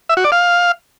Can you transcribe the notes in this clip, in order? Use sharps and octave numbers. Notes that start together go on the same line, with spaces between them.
E5
F#4
D5
F5